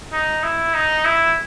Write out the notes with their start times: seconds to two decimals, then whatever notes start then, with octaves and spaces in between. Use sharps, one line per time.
0.12 D#4
0.43 E4
0.74 D#4
1.05 E4